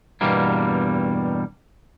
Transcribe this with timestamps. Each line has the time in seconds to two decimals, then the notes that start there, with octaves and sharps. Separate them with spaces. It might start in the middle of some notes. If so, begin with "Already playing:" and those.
0.21 E2 G2 B2 G3 A#3